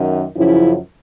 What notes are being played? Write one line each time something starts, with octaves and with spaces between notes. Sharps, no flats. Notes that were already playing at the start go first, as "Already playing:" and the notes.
Already playing: F#2 D#3
F#2 C#3 F3 E4